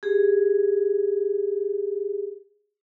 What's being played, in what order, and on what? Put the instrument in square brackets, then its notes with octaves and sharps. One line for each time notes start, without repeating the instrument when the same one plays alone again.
[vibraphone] G4 G#4